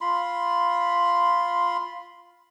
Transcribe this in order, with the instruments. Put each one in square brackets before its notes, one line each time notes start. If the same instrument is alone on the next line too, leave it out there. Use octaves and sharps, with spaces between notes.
[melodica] F4 B5 C6